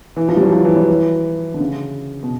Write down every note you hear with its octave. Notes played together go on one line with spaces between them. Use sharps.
E3
F3
G3
F#3
F3
E3
F#3
E3
D3
C#3
B2